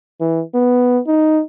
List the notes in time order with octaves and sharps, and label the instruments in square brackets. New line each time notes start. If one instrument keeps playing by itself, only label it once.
[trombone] E3
B3
D#4